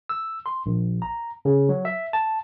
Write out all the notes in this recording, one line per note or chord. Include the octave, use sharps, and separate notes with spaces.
E6
C6
A#1
A#5
C#3
F#3
E5
A5